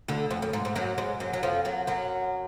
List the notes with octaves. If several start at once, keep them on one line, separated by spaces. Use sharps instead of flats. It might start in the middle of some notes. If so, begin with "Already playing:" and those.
D2 D3
F2
F#2
G#2
G#2
F#2 F#3
G#2 G#3
F#2 F#3
F#3
F2 F3
F#2 F#3
F#2 F#3